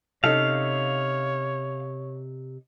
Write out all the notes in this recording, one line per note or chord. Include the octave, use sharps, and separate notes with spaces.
C3 C#4 D#4 A4 C#5 F5